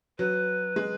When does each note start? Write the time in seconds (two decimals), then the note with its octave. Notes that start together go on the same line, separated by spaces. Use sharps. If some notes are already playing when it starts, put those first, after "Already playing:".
0.19 F#3 B4
0.76 G#3